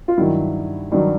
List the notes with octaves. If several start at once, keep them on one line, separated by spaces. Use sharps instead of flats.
F4
G2 D#3 F#3 E4
G2 D#3 F#3 D#4